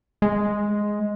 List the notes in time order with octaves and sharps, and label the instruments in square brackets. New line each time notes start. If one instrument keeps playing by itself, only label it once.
[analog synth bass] G#3